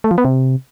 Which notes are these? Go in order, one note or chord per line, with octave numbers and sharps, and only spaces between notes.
A3
F3
B3
C3